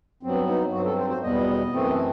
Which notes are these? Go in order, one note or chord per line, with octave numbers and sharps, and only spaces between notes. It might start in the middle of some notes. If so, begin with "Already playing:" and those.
G2 F#3 B3 C4
D#4
G2 F#3 C4 F#4
A4
C5
C5
E2 B2 G3 B3 D#5
F#2 E3 A3 C4